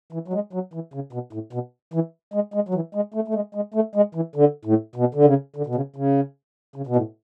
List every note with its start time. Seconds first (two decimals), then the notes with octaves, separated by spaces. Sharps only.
0.13 E3
0.28 F#3
0.33 G#3
0.53 F#3
0.74 E3
0.94 C#3
1.13 B2
1.33 A2
1.53 B2
1.94 E3
2.34 G#3
2.54 G#3
2.69 F#3
2.74 E3
2.95 G#3
3.14 A3
3.28 A3
3.34 G#3
3.55 G#3
3.74 A3
3.95 G#3
4.15 E3
4.36 D3
4.65 A2
4.96 B2
5.15 D3
5.25 C#3
5.56 D3
5.67 B2
5.75 C#3
5.96 C#3
6.76 C#3
6.87 B2
6.96 A2